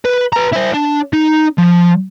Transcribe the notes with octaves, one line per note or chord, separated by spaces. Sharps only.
B4
B4 A#5
E4 C5
D4
D#4
F3